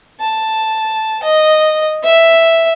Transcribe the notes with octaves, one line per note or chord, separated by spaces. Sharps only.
A5
D#5
E5